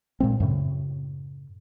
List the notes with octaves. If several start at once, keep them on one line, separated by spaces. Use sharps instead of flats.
A#2 G#3 C4
F#2 A2 C#3